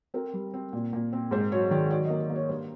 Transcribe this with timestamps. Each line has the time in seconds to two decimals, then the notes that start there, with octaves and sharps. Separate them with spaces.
0.14 C4 A#4
0.33 G3
0.54 C4
0.73 A#2
0.93 A#2
1.13 C4
1.31 G#2 C5
1.52 F#3 C#5
1.71 D#3 D5
1.90 F#3 D5
2.05 A#3 D#5
2.20 D5
2.29 A#3
2.35 C#5
2.49 G2 C5